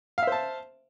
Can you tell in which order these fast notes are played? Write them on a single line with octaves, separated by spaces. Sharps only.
F5 E5 C5 A5